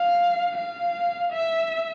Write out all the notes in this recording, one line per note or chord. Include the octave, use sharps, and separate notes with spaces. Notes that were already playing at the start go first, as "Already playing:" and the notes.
Already playing: F5
F5
E5